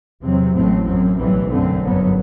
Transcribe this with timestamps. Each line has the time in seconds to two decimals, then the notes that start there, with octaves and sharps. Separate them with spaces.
0.23 E2 C3 F#3 C4
0.55 A1 A2 F#3 A3 C4
0.86 F#2 F#3 C4
1.18 B1 A2 E3 G3 C4
1.50 F#2 D3 A3 C4
1.81 G1 F#2 F#3 B3